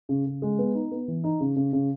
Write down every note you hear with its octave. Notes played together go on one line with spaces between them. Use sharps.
C#3
C#3
G#3
B3
D#4
B3
E3
D#4
C#3
C#3
C#3